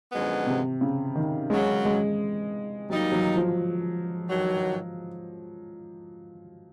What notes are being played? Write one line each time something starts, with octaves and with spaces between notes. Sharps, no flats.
F#2 D3 F3 G#3 B3
C3
C#3
D#3
F#2 C#3 F#3 G#3
G#3
F#3 G3 A#3 D#4
F#3
F3
G2 D#3 F#3